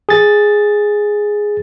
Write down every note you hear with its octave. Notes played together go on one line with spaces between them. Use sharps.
G#4 A6